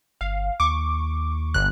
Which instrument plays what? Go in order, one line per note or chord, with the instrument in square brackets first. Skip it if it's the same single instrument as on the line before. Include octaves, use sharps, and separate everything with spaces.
[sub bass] G1 [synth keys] F5
[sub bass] D#2 [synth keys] C#6 D6
[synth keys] G1 F#6